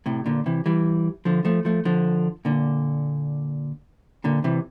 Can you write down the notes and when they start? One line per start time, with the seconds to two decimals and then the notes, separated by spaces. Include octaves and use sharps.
0.06 A2 C3
0.26 A#2 D3
0.46 C3 E3
0.66 E3 G3
1.25 D3 F3
1.45 F3 A3
1.65 F3 A3
1.85 D3 F3
2.45 A#2 D3
4.24 A#2 D3
4.44 C3 E3